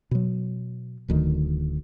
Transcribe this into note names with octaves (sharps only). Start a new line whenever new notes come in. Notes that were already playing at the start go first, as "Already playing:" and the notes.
B2 F#3
D1 D2 D#3